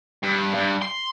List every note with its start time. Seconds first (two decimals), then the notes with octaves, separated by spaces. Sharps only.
0.23 G2
0.55 G2
0.82 C6